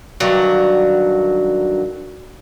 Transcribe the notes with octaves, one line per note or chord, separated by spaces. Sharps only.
G2 D3 D#3 F#3